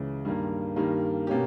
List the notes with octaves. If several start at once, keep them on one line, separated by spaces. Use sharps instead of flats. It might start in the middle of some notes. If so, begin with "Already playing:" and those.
Already playing: C#2 C#3 E3
G2 D#3 A#3
G2 D#3 G3 A#3
B2 A#3 C#4 G4